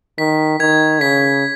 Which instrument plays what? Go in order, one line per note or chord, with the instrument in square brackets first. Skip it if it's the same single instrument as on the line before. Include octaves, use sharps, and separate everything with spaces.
[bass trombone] D#3 [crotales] B6
[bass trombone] D#3 [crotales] G#6
[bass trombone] C#3 [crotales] B6